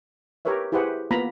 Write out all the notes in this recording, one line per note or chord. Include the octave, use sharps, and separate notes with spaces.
G4 A#4 B4 C#5 E5
E4 G4 G#4 B4 C5 F#5
A#3 B3 F4 A#5 B5